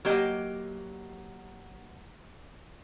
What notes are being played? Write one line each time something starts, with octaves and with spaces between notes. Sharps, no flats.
F#3 A#3 G4 D#5